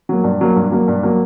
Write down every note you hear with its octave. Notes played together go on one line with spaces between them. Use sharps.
F#3 A#3
G2
F#3 A#3
G2
F#3 A#3
G2
F#3 A#3